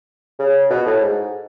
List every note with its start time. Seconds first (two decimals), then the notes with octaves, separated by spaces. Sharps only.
0.39 C#3
0.70 B2
0.86 A2
1.01 G#2